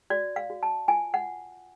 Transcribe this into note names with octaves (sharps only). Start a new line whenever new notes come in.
F#4 D5
F5
F#4
A5
F4 G#5
F#5